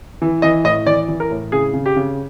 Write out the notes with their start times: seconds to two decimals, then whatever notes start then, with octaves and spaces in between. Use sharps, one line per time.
0.22 E3
0.42 E3 D#5
0.64 A2 D#5
0.87 E3 D5
1.09 E3
1.20 A#4
1.31 A2
1.52 C#3 G#4
1.73 C#3
1.86 G4
1.96 C#3